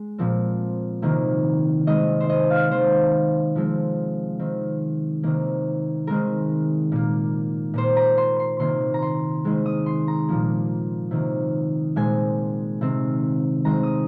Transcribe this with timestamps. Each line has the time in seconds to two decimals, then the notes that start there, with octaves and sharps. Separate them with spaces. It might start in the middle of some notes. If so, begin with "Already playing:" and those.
Already playing: G#3
0.18 A#2 F3 C4
1.02 C3 D#3 A#3
1.87 D#3 G#3 C4 D#5
2.20 C5
2.30 D#5
2.51 F5
2.71 D#3 A#3 C5
3.55 C3 F3 G#3 C4
4.39 D#3 C4
5.23 C3 D#3 A#3
6.07 D#3 G#3 C4 A#4
6.92 A#2 A#3
7.74 A#2 A#3 C5
7.96 A#5
8.18 C6
8.40 C6
8.60 C3 D#3 A#3 C6
8.94 A#5
9.02 C6
9.45 D#3 G#3 C4
9.66 D#6
9.86 C6
10.08 A#5
10.28 A#2 F3 A#3
11.11 C3 D#3 A#3
11.96 A#2 G#3 C4 G#5
12.81 C3 D#3 C4
13.65 D#3 G#3 C4 A#5
13.83 D#6